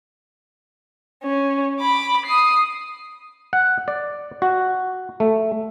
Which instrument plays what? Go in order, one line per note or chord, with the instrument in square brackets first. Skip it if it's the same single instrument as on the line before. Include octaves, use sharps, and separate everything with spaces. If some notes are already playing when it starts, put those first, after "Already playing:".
[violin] C#4
B5 D6
D#6 C7
[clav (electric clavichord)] F#5
D5
F#4
A3